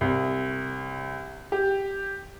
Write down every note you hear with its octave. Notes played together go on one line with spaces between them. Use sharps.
C2
G4